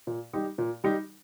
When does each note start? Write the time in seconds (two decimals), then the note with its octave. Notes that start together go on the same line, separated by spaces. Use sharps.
0.07 A#2
0.33 G3 D#4 G4
0.58 A#2
0.84 G3 D#4 G4